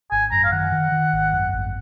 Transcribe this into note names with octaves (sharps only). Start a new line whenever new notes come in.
G#1 G#5
F#2 A#5
F5
D#3 F#5
D#3
D#3
G#1
F#2
G#1